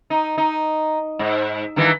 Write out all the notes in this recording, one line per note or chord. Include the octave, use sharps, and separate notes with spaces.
D#4
D#4
G#2
G2 D#3 E3